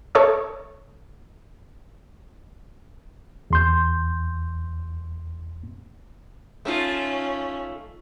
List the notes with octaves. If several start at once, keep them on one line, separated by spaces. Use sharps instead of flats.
A4 C#5 E5 D#6
E2 C6 G6
A3 C#4 D#4 F4